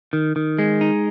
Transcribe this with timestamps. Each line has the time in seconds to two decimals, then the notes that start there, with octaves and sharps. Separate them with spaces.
0.13 D#3
0.36 D#3
0.59 G#3
0.81 D#4